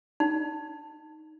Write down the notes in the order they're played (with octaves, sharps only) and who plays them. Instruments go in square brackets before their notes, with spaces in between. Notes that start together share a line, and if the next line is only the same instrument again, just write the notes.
[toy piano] D#4